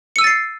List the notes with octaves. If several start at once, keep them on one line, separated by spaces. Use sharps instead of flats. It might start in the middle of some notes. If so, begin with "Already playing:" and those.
E6 A6 C7 C#7 D#7